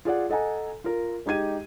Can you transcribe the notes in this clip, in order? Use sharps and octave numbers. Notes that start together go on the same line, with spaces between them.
F4 G#4 D5 F#5
A4 D#5 F#5 G#5 A#5
F4 A#4
G#3 D#4 G4 G#6 D#7